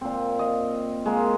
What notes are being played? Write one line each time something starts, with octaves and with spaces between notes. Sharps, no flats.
A#2 C4
D#5 F5
G#3 A#3